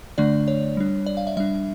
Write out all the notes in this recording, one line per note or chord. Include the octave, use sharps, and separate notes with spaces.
D3 A3 D4 D5
C#5
G3 D4
D5
F5
E5
G3 D4 E5